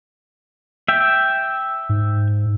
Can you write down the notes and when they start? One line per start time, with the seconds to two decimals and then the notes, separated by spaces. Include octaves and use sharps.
0.88 E5 G5
1.89 G#2